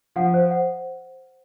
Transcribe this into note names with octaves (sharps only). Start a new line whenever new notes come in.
F3 F#5
C5
F#5